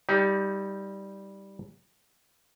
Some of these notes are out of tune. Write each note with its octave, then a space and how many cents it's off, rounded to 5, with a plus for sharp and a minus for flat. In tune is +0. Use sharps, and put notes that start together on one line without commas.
G3 +0 D#4 +30 G4 +0